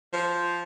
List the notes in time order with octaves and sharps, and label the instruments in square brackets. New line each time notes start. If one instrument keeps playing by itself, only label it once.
[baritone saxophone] F3